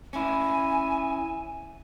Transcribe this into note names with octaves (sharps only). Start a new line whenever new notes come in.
C#4 E4 G#5